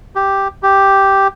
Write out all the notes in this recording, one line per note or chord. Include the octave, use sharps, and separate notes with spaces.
G4
G4